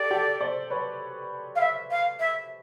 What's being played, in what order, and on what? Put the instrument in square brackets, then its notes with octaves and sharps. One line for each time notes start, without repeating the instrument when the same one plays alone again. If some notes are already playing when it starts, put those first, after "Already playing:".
Already playing: [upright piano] G4 A4 [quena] D5
[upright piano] G4 A4
C5 D5
B4 C#5
[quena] F5
E5
F5
E5